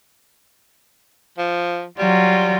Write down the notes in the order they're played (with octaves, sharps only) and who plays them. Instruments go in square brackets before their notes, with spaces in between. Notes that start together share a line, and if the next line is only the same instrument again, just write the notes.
[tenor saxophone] F3
[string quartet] F#3 F4 [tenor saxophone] G3